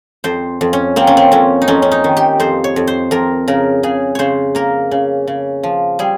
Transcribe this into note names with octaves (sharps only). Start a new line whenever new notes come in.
F2 C5
F2
C#4
A#3 C4
C#4
C4
F2 C#4
D#4
F2 C#4
C#4
D#4
D#3
G4
F2 C5
C#5
F2
C5
F2 A#4
C#3 A#4
C#3 G#4
C#3 C5 C#5
A#3 A#4
C#3
C#3
F3
G3 G#4